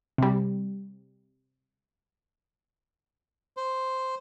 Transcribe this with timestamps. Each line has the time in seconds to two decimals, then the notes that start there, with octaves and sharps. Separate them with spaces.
0.18 C3 G3
3.57 C5